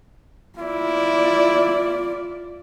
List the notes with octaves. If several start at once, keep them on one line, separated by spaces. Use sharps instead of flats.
E4 F4 D5